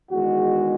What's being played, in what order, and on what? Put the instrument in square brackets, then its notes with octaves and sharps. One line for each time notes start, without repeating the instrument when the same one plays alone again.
[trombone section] E2 D#3 G#3 F#4